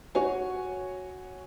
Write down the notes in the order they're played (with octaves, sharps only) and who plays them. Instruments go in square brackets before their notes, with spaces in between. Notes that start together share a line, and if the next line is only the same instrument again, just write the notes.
[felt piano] F#4 C#5 G#5